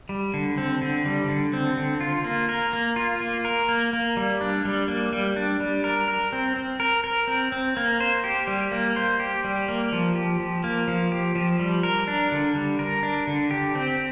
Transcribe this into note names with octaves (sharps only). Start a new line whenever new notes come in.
G3
D3
C4
D3
G3
D3
C4
D3
F4
A#3
A#4
A#3
F4
A#3
A#4
A#3
A#3
G3
D4
G3
A#3
G3
D4
G3
A#4
A#4
C4
C4
A#4
A#4
C4
C4
A#3
C5
G4
G3
A#3
C5
G4
G3
A#3
F3
G4
F3
A#3
F3
G4
F3
G3
A#4
D4
D3
G3
A#4
D4
D3
G4
C4